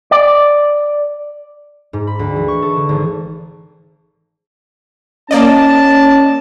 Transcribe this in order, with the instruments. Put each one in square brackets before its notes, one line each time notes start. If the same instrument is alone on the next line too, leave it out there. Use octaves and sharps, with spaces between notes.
[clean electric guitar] D5
[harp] G#2
B5
D2
E3
C#6
A4
D3
G#1
[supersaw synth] A#3 D5 D#5 [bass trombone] C#4 [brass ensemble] A5